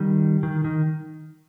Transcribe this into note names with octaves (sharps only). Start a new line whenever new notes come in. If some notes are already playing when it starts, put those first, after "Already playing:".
Already playing: D#3 G3
D#3
D#3